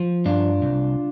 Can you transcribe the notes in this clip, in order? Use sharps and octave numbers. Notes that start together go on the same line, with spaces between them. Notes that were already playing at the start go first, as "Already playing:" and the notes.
Already playing: F3
G2 D4 F4
C2